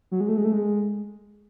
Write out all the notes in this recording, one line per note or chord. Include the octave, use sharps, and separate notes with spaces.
F#3
G#3
A3
G#3
A3
G#3